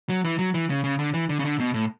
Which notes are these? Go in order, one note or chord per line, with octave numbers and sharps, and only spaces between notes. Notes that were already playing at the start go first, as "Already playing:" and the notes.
F#3
E3
F#3
E3
C#3
C#3
D3
E3
D3
C#3
D3
B2
A2